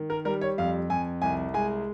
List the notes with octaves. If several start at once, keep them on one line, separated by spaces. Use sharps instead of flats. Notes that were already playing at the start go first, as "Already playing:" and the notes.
Already playing: D#3
A#4
G3 A#4
C#5
F2 F5
F2 G#5
C2 G#5
G#3 G#5